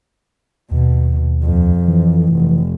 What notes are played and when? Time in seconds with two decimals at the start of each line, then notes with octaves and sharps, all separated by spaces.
0.71 D#2 B2
1.44 F2
1.88 E3
2.33 F1